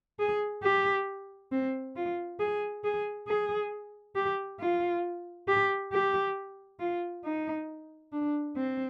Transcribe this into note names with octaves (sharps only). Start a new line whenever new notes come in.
G#4
G4
C4
F4
G#4
G#4
G#4
G4
F4
G4
G4
F4
D#4
D4
C4